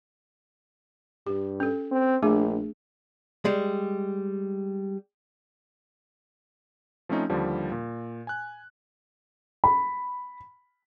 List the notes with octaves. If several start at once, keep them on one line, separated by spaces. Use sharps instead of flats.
G2 G4
C#4 A4
C4
A#1 A3 D4 G#4
G3 G#3
F3 A3 C4 C#4 D#4
D#2 D3 F3 G3
A#2
G#5 F#6
B5